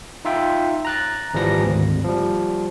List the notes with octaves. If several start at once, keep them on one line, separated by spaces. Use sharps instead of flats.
D#4 F4 E5 G5
A#5 F#6 A6
G#1 E3 F3 G3 A#6
G#1 D2
F3 G3